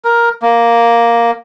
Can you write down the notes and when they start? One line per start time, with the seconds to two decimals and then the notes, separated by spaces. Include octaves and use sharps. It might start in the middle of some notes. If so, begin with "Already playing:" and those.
0.05 A#4
0.42 A#3